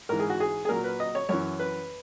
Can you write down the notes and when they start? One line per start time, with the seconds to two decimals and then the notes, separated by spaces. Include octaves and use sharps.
0.09 G#2 E3 A#4
0.20 G#4
0.30 F#4
0.40 G#4
0.65 G#4
0.69 A#2 F#3 A#4
0.84 B4
1.00 D#5
1.15 C#5
1.29 F#2 E3 C#5
1.60 B4